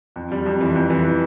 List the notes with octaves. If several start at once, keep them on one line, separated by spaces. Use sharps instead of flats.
F2
G3
F2
E3
F2
E3